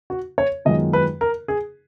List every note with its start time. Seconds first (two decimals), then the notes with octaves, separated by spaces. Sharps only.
0.10 F#4
0.38 C#5
0.65 F#2 D#3 G#3 B3 F4 D#5
0.93 B4
1.21 A#4
1.48 G#4